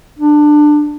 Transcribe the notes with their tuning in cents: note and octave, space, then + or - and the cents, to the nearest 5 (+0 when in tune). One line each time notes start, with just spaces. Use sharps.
D4 +20